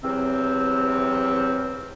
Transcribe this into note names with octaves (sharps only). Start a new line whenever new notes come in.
E2 C3 F#3 C4